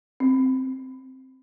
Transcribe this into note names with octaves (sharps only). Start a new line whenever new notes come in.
C4